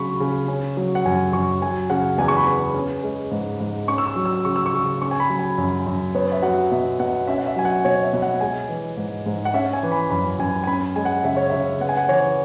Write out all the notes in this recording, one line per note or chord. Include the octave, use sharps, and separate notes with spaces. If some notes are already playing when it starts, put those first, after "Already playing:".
Already playing: C#3 F#3 B5 C#6
C#3
C#4
F#3
F#5
F#2 G#5
F#2 C#6
F#3 G#5
C#3 F#5
E2 G#5
C#6
B5
B3
C#4
G#3
G#2
G#2
C#4 C#6
E6
C#6
F#3
E6
C#3 C#6
E6
C#6
C#3
C#4 C#6
G#5
B5
F#3
G#5
F#2
F#2
B3 C#5
E5
F#3 F#5
B2 E5
B2 F#5
C#4 E5
F#5
E5
F#3 G#5
F#5
B2 C#5
E5
B2
F#5
G#3 G#5
E3
G#2
G#2
F#5
C#4 E5
G#5
E3
B5
F#2 B5
F#2 G#5
G#5
C#4 B5
G#3 G#5
F#5
C#3 E5
C#5
C#3 E5
B3 F#5
G#5
F#5
E3 C#5